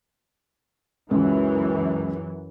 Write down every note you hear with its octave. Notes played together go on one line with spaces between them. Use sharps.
C#2 F#2 E3